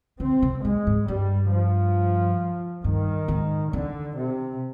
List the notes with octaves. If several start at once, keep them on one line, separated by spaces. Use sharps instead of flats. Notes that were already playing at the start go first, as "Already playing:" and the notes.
D3 C4
C3
A#2 G#3
G#2
G2 G3
F3
G2 D#3
G#2
D3 D#3
C3